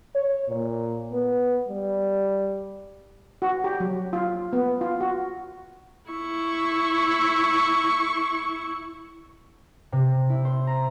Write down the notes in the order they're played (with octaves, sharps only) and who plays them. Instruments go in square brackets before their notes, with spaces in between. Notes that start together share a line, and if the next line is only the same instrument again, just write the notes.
[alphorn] C#5
A#2
B3
G3
[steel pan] F#4
G4
F#3
F4
B3
F4
F#4
[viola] E4 C#6
[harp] C3
E4
C5
A#5